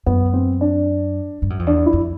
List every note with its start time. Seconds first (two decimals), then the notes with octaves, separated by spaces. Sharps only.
0.06 F#2 B3
0.33 C4
0.61 D4
1.42 G2
1.50 F#2
1.59 F2
1.66 E2 D4
1.86 E4
1.93 F2